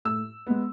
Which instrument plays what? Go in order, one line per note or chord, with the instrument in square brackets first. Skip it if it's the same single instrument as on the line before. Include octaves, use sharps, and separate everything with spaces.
[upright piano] A2 E6
G#3 B3